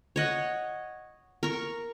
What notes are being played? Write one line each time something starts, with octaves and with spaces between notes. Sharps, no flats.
C#5 D#5 F#5
A#4 C#6